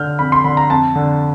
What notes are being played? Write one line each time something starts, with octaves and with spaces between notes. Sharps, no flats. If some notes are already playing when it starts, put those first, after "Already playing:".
Already playing: D3 F6 G6
F2 B5
C6
D3 B5
A#5
F2 A5
D3